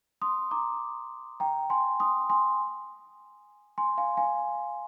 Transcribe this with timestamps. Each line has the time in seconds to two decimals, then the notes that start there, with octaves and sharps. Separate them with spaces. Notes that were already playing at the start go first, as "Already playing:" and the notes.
0.22 C6 D#6
0.51 A#5 D6
1.40 G5 A#5
1.70 G#5 C6
2.00 C6 D#6
2.30 G#5 C6
3.78 G#5 C6
3.98 F5 G#5
4.17 F5 G#5